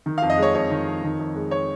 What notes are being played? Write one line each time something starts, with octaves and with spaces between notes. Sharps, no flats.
D#3
F2 F5
D#5
G#3 C#5
F2 C#5
D#3
F2
D#3
F2
G#3
C#5